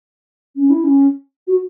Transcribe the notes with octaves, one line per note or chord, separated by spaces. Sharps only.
C#4
E4
C#4
F#4